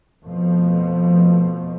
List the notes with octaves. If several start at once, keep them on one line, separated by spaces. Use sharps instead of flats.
F2 B2 F3 A3